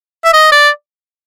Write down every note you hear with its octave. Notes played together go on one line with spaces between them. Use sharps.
E5
D#5
D5